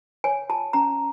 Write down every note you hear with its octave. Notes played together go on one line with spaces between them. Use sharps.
C#5 G#5
F4 A5
C#4 A#5